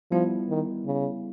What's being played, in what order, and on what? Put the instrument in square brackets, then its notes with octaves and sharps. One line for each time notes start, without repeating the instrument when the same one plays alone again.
[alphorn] F3 [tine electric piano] G3 B3 E4
[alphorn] D#3
C#3